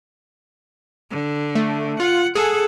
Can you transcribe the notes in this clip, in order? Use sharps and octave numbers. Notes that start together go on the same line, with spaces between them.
D3
A3
F4 F#5
G#4 A4 F#5